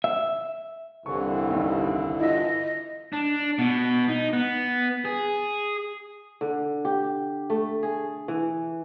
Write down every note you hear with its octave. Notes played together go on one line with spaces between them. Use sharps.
E5
C2 G2 D3 E3 C#6
D#2
E4 F4 D#5 E5
D4
B2 B3
D#4
B3
G#4
D3
G4
A3
G#4
E3